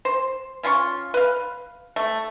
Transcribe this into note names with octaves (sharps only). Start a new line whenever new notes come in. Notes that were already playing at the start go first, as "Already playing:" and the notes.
C5
C#4 F4 G#5 C#6
B4 F5
A3